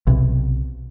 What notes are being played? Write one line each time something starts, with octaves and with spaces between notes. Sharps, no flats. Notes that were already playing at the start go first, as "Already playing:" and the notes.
B1 C3